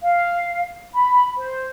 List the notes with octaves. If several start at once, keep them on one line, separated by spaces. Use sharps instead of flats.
F5
B5
C5